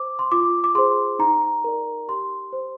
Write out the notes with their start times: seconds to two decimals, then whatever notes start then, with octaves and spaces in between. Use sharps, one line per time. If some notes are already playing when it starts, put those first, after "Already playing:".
Already playing: C5 D6
0.19 C6
0.32 F4 D6
0.64 D6
0.75 G#4 C5 C6
1.19 D#4 A#5
1.64 A#4 D5
2.08 G4 C6
2.53 C5